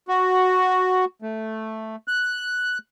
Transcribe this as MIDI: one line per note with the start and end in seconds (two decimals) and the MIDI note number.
0.08 1.05 66
1.22 1.96 57
2.08 2.78 90